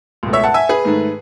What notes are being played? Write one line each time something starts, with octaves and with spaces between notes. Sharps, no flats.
C#2 B2 A3
C#5 E5
F#5 A5
E5 G#5
G#4 B4
G#2 D#3 A3